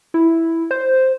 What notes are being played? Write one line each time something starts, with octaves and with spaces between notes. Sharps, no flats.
E4
C5